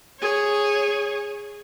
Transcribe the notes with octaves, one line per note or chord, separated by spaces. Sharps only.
G#4 C#5